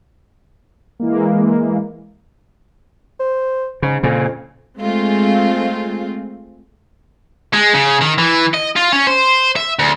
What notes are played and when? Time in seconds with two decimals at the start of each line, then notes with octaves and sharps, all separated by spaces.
1.00 E3 G#3 A#3
3.20 C5
3.82 G#2 C#3
4.03 F2 A#2 C#3
4.79 G#3 A3 C4 F4 G#4
7.53 G#3
7.74 C#3
8.01 D#3
8.18 E3
8.54 D#5
8.76 F4
8.92 C#4
9.07 C5
9.56 E5
9.79 D2